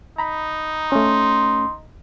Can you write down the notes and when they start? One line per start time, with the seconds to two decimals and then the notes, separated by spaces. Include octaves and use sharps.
0.18 D#4 A#5 B5
0.92 A3 C#4 C6